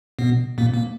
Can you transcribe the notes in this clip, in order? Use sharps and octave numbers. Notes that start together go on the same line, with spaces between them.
B2 B3
A#2 A#3
A#3